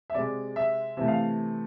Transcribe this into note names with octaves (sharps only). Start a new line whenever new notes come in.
E5
C3 G#3 D5
E5
C3 E3 A3 E5
F5